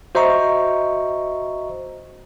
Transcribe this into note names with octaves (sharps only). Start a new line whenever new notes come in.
F#4 C5 D#5 E5 A#5 C#6